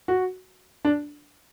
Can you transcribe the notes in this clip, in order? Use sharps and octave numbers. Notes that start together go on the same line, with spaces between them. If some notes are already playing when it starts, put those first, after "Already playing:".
F#4
D4